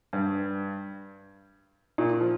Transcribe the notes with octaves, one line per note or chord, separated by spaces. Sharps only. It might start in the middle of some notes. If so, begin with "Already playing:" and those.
G2
A#2
F3